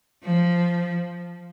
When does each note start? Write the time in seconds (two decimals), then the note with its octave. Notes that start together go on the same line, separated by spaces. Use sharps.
0.24 F3